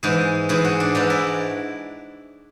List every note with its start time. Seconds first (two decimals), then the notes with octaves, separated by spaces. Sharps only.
0.03 G#2 E3 G#4
0.49 G#2 E3 G#4
0.64 F#4
0.80 D4
0.95 G#2 E3 D4
1.10 E4